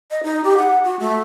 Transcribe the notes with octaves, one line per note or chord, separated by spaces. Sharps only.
D#5
D#4
G4
F#5
F#4
A3